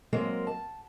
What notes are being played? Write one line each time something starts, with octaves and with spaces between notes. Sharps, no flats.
F#3 G#3 A#3 C4 A#4
A5